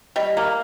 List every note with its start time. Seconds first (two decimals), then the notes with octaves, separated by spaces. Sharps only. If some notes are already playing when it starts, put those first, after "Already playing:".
0.16 G3 D#5
0.37 A#3